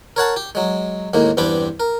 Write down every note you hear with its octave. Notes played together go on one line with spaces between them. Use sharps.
A#4 C#5 F#5 A5
G4
F#3 G#3
D#2 A2 G#3 A#3
E2 G2 C4 D4 B5 D6
A#4